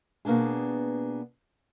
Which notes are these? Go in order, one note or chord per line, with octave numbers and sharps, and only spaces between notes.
B2 A#3 B3 D4 G#4